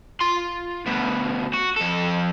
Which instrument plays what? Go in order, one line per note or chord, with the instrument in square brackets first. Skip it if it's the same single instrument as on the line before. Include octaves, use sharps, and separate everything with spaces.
[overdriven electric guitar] F4 C6
D2 B2
F#4
F2 A4